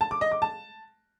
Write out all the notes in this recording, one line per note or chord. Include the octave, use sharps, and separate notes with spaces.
A5
D6
D#5
D6
A5